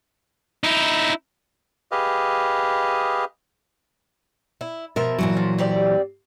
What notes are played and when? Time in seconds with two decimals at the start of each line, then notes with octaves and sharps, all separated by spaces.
0.64 D#4 E4
1.91 G4 G#4 B4 D#5 F5
4.61 E4
4.96 B2 F3 A#4 E5
5.19 A#2 E3 F#3
5.37 F3
5.58 C4 G4 D5